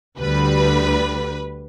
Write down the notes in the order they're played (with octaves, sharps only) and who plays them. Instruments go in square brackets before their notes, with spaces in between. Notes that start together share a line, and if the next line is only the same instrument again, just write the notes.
[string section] D2 D3 G3 B4